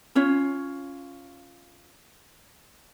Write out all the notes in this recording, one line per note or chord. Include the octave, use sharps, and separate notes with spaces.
C#4 F4 C#5